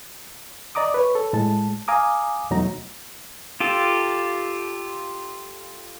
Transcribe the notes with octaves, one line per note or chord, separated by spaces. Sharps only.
D5 D#5 A#5 D6 D#6
B4 C#5
A4
A2 G#3 A5
F5 G#5 A#5 D6 D#6
E2 B2 F#3 A3 D#4 A#5
F4 G4 A4